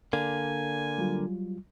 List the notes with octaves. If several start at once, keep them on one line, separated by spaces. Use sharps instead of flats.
D3 A#3 G#5
F#3 G3 F4